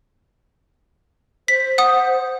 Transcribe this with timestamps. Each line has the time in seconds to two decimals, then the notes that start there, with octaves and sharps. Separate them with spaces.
1.48 C5 B6
1.78 F#5 D#6